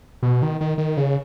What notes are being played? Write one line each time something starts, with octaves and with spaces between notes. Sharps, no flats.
B2
D#3
D#3
D#3
C#3